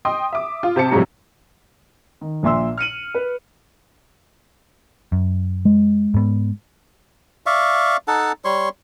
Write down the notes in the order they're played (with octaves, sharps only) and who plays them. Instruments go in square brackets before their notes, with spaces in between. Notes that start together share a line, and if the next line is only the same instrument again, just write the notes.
[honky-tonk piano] D#5 G5 C6 D#6
E5 D6
F4
C3 C5 A5 C#7
F#2 A2 C3 F3 G3 G#3
[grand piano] D#3
A#1 A#2 E5 C6 E6
F6 C#7 D#7 F#7
B4
[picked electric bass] F#2
[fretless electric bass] G#3
[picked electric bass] G#2 B3
[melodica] D5 E5 F5 C#6
D#4 A4 F#5 A5
G3 C#5 C6 C#6